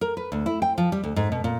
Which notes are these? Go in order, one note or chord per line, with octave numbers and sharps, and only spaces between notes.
A#4
B4
D2
E4
G5
F3
G3
D2
G#2
B2
A#2